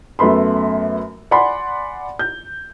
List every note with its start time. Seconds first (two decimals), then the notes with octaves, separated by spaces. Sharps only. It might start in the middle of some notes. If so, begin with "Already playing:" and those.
0.19 F#2 A3 B3 B5 C6
1.31 D5 F#5 G#5 B5 C6
2.19 G6